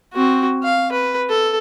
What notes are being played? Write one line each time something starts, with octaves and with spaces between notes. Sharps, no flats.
C4 F#4
F5
B4
A4